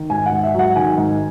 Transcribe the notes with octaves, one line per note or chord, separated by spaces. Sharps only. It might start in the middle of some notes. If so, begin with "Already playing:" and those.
Already playing: D#3
G#2 G#5
F#5
G#2
E5
F#3
F#5
D#3 G#5
G#2